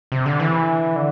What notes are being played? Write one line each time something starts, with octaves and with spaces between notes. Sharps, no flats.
C3
D3
E3
D3